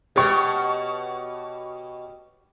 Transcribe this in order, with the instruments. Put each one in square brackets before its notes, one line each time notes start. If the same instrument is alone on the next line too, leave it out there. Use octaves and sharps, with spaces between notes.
[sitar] B2 C#5 [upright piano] G4 C#6